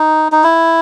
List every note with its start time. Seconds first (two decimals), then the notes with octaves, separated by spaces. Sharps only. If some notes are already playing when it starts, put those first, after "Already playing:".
Already playing: D#4
0.32 D#4
0.44 E4